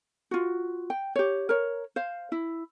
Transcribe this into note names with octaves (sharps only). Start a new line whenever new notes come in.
F4 F#4
G5
G4 C#5
A#4 C#5
C5 F5
E4